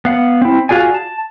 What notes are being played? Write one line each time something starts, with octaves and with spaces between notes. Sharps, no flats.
B3 F5 F#5
C4 E4
F4 F#4 G#4 D5 G#5
A5